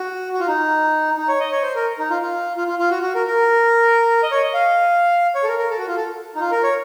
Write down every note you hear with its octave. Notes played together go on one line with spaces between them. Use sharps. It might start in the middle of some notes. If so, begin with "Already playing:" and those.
Already playing: F#4
F#4
F4
D#4
D#4
C#5
D#5
C#5
C5
A#4
D#4
F4
F4
F4
F4
F4
F#4
F#4
A#4
A#4
D#5
C#5
D#5
F5
C#5
A4
A#4
A#4
A4
F#4
F4
A4
D#4
F4
A#4
C#5